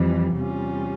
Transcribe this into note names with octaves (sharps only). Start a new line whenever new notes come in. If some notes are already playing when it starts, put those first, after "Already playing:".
Already playing: F2 E3 G3
E2 C3 G3 C#4 F4